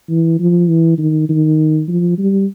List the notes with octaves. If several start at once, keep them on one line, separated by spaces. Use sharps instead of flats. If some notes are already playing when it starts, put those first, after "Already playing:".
E3
F3
E3
D#3
D#3
F3
G3